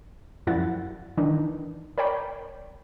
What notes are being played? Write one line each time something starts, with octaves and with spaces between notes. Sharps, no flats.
F#2 F3 G3 E4 F#5 A6
D#3 E3 D4 D#4
A#4 C#5 D5 G5 B5